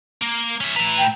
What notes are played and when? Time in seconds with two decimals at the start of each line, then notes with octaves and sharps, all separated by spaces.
0.22 A#3
0.61 C#4 E5
0.76 A2 B4 E5 A#5
0.98 G5